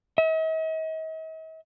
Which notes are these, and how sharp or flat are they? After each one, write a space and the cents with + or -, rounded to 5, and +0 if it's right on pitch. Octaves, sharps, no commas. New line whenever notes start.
D#5 +45